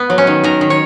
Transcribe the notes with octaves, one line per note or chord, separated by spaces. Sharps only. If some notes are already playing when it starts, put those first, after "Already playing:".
Already playing: B3
F#3
C#4
D#3
D#3 A#4
D#3
C#5